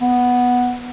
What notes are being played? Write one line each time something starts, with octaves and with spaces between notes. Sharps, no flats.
B3